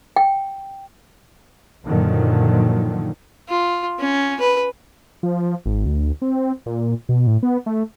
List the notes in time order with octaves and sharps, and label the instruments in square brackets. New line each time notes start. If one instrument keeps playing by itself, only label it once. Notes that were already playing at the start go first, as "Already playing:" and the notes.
[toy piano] G5
[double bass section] F#2 A#2 D3 D#3 F3 F#3
[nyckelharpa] F4
C#4
B4
[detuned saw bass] F3
G#1
D2
C4
A#2
B2
A2
B3
A3